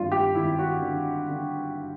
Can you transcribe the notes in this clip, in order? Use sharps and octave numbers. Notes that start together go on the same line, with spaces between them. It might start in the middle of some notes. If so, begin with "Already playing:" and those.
Already playing: G#1 G2 F4
G4
G#1 E4
F#4
D3
D3